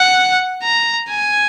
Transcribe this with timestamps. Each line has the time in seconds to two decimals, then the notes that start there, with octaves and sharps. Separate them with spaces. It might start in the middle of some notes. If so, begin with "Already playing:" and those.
Already playing: F#5
0.63 A#5
1.10 G#5